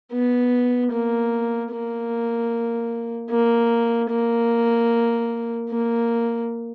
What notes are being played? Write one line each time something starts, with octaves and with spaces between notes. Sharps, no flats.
B3
A#3
A#3
A#3
A#3
A#3